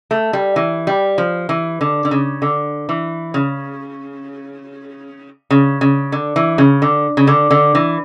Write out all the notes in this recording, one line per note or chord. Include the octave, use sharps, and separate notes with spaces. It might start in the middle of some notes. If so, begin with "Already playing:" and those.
A3
G3
E3
G3
F3
E3
D3
D3
C#3
D3
E3
C#3
C#3
C#3
D3
E3
C#3
D3
C#3
D3
D3
E3